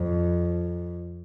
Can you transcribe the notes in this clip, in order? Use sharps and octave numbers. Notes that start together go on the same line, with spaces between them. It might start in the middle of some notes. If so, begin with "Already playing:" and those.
Already playing: F2